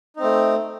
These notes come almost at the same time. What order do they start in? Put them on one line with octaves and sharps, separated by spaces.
D#4 C4 A3